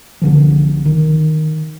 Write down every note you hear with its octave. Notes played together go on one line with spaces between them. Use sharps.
C2 D3 F3
D#3